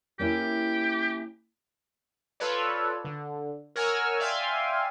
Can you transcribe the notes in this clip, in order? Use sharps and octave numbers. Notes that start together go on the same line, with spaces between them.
A#3 C#4 E4 G4
F4 A4 B4 C#5 D5
D3
A#4 C#5 F#5 G#5 E6 F6
D5 E5 F5 G5 G#5 C6